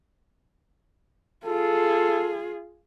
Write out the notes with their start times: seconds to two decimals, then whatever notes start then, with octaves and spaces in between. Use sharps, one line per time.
1.45 F4 G#4 A4